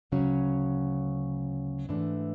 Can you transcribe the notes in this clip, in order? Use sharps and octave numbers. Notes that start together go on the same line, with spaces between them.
D2 C#3 F#3 C#4
G#2 E3 A3 D4